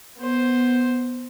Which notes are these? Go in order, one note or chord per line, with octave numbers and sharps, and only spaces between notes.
B3 C5